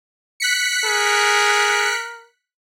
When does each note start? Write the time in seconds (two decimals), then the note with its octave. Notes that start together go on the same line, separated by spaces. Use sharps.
0.40 F#6 B6 C#7
0.85 G#4 A#4